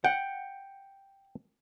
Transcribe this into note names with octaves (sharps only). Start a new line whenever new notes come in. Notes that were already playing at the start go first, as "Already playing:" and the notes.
F#5 G5